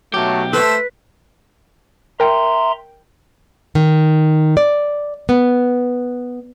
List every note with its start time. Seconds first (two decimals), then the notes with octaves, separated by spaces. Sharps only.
0.14 B1 F#3 A3 G4
0.53 A3 B4 C5 E6
2.20 A#4 E5 G5 A#5 C6
3.75 D#3
4.57 D5
5.29 B3